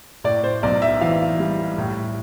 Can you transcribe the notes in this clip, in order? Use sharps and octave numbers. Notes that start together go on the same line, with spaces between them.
A2 D5
C5
B1 D5
E5
E3 F5
G3
A2